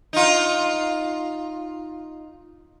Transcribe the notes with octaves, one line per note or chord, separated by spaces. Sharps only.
D#4 F4